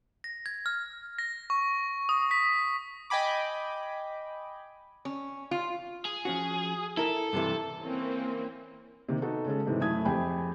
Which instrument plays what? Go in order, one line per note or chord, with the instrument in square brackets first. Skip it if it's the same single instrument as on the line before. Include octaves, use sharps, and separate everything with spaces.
[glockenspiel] A#6
G#6
F6
[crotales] A#6
C#6
D#6
B6
[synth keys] D#5 G5 G#5 B5 D6
[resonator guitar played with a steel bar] C#4
F4
[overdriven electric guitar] G#4
[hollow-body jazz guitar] F3 C#4 F#4
[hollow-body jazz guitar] E4 A#4 [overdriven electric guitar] A4
[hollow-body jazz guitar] G2 C3 E3
[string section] E3 A#3 C4 C#4
[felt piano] C3 D#3 A#3
B3 D#4 F#4 A4
C#3 G#3 C#4 A4
G#2 C3 E3
F#2 A3 E4 D#6 G#6
F2 G4 G#4 G5 G#5 B5